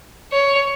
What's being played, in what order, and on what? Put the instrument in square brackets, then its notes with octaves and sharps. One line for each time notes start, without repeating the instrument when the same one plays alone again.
[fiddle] C#5